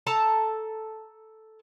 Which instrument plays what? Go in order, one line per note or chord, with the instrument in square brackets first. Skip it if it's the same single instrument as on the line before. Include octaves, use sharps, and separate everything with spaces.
[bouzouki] A4 A5 A#5